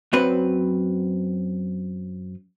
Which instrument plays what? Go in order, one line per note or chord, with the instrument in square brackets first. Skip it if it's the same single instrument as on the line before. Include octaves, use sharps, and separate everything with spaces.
[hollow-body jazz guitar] F#2 F#3 C4 B4